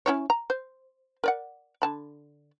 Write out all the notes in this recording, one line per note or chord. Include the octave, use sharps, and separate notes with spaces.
C#4 E4 C#5
A#5
C5
A#4 D5 F#5
D3 A5 B5